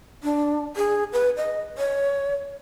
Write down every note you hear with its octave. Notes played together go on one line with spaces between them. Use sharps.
D4
G#4
B4
D#5
C#5